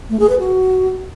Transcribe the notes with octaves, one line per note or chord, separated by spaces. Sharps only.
A3
G#4
B4
F#4